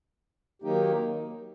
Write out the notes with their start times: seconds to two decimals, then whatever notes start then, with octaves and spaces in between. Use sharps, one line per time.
0.62 D#3 F#3 A#3 D#4 G4